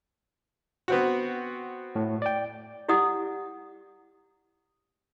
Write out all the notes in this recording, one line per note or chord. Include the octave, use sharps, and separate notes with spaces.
B3 C4 F#4
A2
D5 G5
E4 G4 D5 F#5 D#6